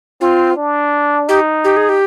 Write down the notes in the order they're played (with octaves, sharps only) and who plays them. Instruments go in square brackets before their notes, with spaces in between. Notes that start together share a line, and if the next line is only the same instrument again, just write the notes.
[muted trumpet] C4 [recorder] F4
[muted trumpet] D4
[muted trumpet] D#4 [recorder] G4
[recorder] G4
G#4
G4